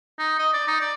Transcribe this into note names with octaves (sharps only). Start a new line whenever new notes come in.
D#4
D#5
D5
D#4
D5